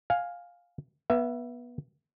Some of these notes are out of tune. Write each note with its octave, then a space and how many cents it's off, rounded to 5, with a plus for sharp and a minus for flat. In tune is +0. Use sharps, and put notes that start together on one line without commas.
F5 +10 G#5 +0
B3 -20 E5 +25